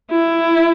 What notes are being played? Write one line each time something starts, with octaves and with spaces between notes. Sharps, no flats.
E4